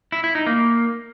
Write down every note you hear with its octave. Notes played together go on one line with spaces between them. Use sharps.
E4
E4
D#4
A#3